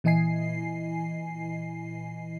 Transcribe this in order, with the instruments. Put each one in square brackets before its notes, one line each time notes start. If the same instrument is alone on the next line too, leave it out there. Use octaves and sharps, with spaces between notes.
[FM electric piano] A#2 E3 E4 D#5 G#5 C7